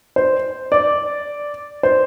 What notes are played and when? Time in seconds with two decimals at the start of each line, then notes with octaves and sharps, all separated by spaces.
0.16 C5
0.72 D5
1.83 C5